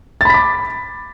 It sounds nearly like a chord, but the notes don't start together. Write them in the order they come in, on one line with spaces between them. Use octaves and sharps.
A6 B5 B6 D6